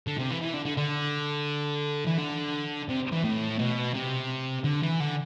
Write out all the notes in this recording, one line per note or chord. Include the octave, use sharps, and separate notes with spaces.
D3
C3
E3
E3
D3
D3
D3
E3
D3
C3
E3
A2
B2
C3
D3
E3
D3